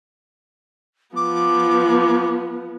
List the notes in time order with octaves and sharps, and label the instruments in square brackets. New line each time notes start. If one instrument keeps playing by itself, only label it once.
[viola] F3 B3 [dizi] D6